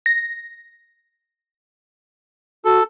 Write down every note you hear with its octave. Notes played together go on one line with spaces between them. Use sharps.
A#6
F#4 A4